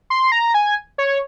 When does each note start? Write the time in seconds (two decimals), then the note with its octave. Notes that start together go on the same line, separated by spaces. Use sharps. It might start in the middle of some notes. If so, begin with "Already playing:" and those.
0.10 C6
0.32 A#5
0.54 G#5
0.98 C#5